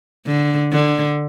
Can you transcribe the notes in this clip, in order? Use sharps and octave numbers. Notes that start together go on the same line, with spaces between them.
D3
D3